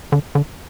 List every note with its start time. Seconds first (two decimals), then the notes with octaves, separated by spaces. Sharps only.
0.12 D3
0.35 D3